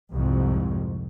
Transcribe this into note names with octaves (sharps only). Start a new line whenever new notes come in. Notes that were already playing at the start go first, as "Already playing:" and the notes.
C2 F2 G#2 C3